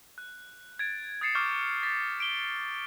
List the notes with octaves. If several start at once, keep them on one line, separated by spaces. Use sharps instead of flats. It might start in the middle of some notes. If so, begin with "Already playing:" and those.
F#6
G#6 A6 D7
D#6 G#6 A6 C7 C#7 E7
C#6 D6 F6 G6 E7
A6 B6
D7 G7